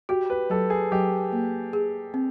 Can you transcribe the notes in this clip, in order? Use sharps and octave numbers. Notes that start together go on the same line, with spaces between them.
F#4 G4
B4
F#3 A4
G#4
F#3 G4
A#3
G#4
C4